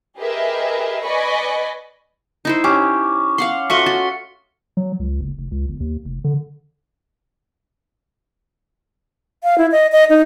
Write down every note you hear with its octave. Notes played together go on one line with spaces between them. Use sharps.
G4 G#4 A#4 B4 D#5 E5
B4 D5 D#5 G#5 B5 C#6
D#4 E4 C5
C#4 G4 D6
F5 F#5 C6
A3 F4 F#4 D#5 C#6 B6 C#7 G7
F#4 A6
F#3
C#2
F#1
F1
C#2
G1
D#2
F1
D3
F5
E4
D#5
D#5
D#4